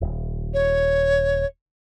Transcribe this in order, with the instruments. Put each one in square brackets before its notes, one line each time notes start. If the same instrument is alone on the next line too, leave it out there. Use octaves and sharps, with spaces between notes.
[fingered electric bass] D#1
[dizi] C#5